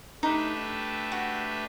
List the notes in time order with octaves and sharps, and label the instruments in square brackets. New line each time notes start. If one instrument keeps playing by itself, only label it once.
[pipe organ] A3 D4 G4 B4 E5 [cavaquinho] D#4
[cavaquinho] F#4